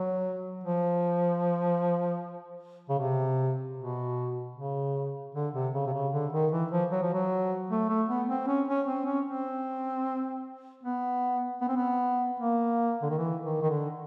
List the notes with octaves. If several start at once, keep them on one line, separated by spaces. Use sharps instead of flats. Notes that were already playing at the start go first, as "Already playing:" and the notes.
Already playing: F#3
F3
C#3
C3
B2
C#3
D3
C3
C#3
C3
C#3
D3
D#3
E3
F3
F#3
F3
F#3
A3
A3
B3
C4
C#4
C#4
C4
C#4
C4
B3
B3
C4
B3
A#3
D3
D#3
E3
D#3
D#3
D3